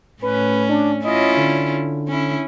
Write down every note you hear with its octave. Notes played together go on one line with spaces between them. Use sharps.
A2 C#4 B4
D4
C#4 E4 F4 D#5
D3
C#4 E4